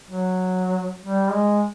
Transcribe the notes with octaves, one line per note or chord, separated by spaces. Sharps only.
F#3
G3
G#3